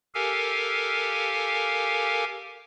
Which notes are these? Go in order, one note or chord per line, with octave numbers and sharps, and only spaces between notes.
G4 A4 A#4 F5 G#5